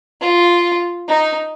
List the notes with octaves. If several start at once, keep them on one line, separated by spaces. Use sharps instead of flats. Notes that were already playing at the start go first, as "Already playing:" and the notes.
F4
D#4